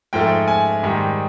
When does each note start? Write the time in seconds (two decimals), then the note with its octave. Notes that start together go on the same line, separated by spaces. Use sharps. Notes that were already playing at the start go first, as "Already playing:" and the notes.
0.13 G#2 F3 A3 G5
0.48 G#5
0.83 G#2 D#3 G3